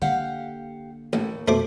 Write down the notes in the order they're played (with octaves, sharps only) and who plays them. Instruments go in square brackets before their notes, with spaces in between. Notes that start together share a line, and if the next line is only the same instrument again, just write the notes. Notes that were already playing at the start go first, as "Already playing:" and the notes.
[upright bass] D3 A#3 [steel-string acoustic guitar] G4 F5 F#5
[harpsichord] A1 [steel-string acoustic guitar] D#2 A2
[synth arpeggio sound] F2 B2 [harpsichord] A3 C5 D6